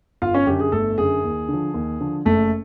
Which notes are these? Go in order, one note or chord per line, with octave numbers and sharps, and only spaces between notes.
G1 F4 F5
C#4 C#5
F#2 D3 G4
G#4
G1 A3 A4
F#2 D3 G#4
D#2
D3
F3
D#2
D3 F3
F#1 A3 A4